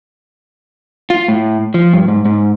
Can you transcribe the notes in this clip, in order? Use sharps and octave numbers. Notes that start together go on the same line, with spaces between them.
F4
A2
F3
G2
G#2
G#2